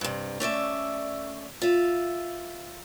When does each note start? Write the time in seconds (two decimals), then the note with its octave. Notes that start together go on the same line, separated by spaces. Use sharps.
0.01 G2 C3
0.40 A3 C#4 D5 E5
1.62 F4 E5